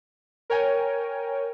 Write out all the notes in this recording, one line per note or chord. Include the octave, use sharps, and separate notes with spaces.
A#4 C#5 G5 G#5